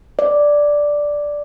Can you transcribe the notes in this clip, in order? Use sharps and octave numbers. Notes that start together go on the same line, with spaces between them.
D5